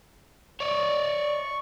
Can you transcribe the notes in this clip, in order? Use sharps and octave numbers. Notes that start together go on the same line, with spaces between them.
C#5 D5 C#6